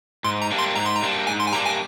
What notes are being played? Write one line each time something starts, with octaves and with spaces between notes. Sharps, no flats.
G#2 C6
A#5
G3 A#3 D4
C6
G#2 A#5
C6
A#5
G3 A#3 D4
G#2 G#5
C6
G#5
G3 A#3 D4 A#5
G#5